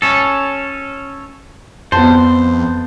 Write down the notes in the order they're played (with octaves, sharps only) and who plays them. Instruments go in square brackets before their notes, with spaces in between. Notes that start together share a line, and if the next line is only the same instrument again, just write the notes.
[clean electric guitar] C#4 A4
[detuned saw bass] F2 [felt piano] B3 A5 [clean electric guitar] C5